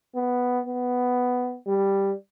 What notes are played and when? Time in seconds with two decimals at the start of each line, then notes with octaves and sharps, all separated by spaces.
0.15 B3
0.66 B3
1.67 G3